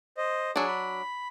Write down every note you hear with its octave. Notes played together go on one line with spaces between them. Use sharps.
C5 D#5
F#3 D4 G#4
B5